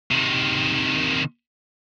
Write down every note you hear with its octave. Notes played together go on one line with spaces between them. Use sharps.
C3 D#3